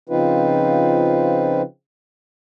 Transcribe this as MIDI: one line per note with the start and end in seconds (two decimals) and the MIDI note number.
0.09 1.62 49
0.09 1.62 53
0.09 1.62 60
0.09 1.62 63
0.09 1.62 65
0.09 1.62 71